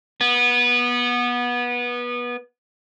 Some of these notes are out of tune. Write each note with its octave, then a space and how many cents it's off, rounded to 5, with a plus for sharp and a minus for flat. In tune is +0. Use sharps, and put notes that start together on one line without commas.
B3 -20